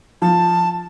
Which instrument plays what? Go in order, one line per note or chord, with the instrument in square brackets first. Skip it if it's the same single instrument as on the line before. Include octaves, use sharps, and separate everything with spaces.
[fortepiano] F3 [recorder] A5